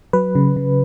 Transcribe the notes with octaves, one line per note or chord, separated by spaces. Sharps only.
F#3 B4
C#3
C#3